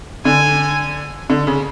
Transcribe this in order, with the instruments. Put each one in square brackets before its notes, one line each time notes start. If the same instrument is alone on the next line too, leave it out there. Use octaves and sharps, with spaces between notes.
[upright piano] D3 [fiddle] G#5
[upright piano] D3
C#3